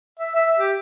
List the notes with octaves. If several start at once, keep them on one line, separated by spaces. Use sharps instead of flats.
E5
E5
G4